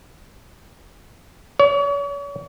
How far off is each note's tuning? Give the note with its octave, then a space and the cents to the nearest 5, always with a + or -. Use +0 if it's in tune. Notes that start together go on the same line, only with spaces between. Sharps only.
C#5 +40